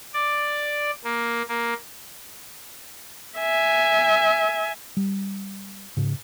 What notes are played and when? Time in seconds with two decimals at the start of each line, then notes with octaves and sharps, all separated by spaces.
0.14 D5
1.04 A#3
1.49 A#3
3.39 E5 G#5
4.97 G3
5.97 G#2 C#3